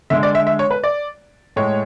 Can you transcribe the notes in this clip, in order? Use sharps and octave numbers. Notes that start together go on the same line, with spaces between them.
D3 G#3 E5
D5
E5
E5
C#5
B4
D5
A2 G#3 C#5